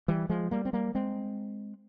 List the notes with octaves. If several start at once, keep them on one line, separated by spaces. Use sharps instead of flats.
E3 G3
F3 G#3
G3 A#3
C4
G3 A#3
G#3 C4